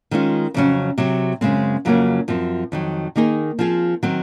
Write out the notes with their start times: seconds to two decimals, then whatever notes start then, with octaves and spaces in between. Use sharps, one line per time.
0.11 D#3 G#3 C#4 F4
0.54 F2 C#3 F#3 C#4
0.98 C3 F#3 C4
1.41 F#2 C#3 G#3 C4
1.85 F2 C#3 F#3 A#3 C#4
2.28 F#2 F3 C4
2.72 F2 D#3 F#3
3.16 D#3 A#3 D#4 G#4
3.59 F3 C4 F4 G#4
4.03 D#3 F#3 C4